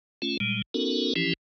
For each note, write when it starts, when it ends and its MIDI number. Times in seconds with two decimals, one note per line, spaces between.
0.22 0.37 57
0.22 0.37 61
0.22 0.37 65
0.40 0.62 46
0.40 0.62 55
0.40 0.62 56
0.74 1.13 59
0.74 1.13 61
0.74 1.13 63
0.74 1.13 66
0.74 1.13 69
0.74 1.13 70
1.16 1.33 52
1.16 1.33 53
1.16 1.33 61
1.16 1.33 64
1.16 1.33 67